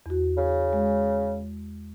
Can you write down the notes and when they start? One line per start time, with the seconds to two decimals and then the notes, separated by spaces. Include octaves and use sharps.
0.06 E2 F#4
0.37 C#3
0.73 G#3